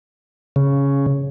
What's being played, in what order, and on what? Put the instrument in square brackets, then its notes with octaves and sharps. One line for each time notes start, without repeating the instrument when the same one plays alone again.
[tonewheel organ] C#3